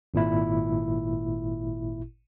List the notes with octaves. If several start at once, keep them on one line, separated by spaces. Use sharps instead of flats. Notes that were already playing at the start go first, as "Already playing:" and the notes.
G#1 A#2 E4